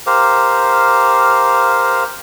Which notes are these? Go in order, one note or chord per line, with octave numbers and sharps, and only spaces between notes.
G4 A#4 C5 F5